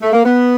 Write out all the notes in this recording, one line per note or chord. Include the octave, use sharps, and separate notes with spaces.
A3
A#3
B3